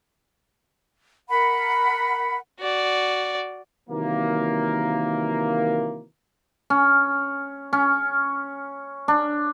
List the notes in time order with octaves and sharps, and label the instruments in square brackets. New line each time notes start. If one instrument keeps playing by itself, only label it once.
[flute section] A#4 F#5 B5
[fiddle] F#4 D5
[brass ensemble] C3 D#3 E3 F#3 A#3
[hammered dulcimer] C#4
C#4
D4